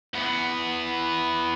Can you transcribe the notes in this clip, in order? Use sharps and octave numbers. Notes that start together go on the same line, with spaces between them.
E2 B3